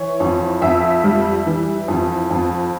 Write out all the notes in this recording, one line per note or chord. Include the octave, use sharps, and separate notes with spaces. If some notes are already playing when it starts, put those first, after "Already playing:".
Already playing: E3 C#5
F2
F2 E5
G3
E3
F2
F2